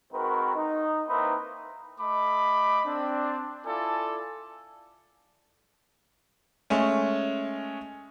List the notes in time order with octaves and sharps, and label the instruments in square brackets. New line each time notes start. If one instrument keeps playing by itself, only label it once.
[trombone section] G#2 D#3 C4 F#4 A#4 B4
D#4
A#3 C4 D#4 E4 B4
[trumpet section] A3 D#5 B5 D6
C4 D4
E4 F4 A4 D5 G#5
[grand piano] G#3 A3 C#4